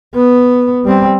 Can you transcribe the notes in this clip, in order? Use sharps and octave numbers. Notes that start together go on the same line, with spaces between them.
B3
G3 C4